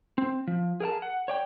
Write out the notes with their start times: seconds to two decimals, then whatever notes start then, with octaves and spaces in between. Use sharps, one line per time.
0.18 C4
0.47 F3
0.80 G#4 A#4 F5 A5
1.02 F#5
1.28 C#5 D5 G5